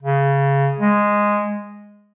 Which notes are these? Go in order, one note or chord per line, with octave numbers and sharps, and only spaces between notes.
C#3
G#3